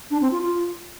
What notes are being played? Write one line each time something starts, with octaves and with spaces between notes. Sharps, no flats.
D4
C4
F4
F4